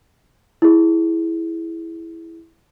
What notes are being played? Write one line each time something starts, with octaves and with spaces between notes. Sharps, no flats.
E4 G#4